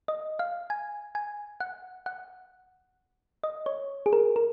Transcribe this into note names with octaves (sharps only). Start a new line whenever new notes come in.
D#5
F5
G#5
G#5
F#5
F#5
D#5
C#5
G#4
A#4
A#4